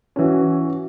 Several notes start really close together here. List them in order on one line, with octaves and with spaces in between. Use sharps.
C#4 E3 F#4